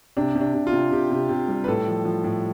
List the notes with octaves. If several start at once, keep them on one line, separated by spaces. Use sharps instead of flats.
C3 D4
C3
D4
C3
F4
C3
C3 G4
C3
C3
G3
B4
A2 A4
F3
F3
A2